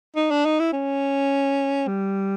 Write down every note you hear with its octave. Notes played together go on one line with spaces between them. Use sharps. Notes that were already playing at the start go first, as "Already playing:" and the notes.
D#4
D4
D#4
E4
C#4
G3